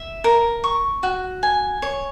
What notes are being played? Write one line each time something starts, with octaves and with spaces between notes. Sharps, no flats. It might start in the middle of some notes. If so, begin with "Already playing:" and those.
Already playing: E5
A#4
C#6
F#4
G#5
C#5